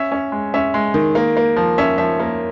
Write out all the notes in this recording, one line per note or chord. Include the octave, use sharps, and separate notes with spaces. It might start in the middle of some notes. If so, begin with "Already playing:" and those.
Already playing: C#4 E5
C#4
G#3
C#4 E5
G#3
D#3
A#3
A#3
F3
C#4 E5
F3 E5
A#3